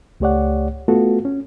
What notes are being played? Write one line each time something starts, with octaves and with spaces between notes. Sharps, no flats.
C#2 A3 G4 C#5 D5 F#5
A3 B3 F4 F#4 A4
C#4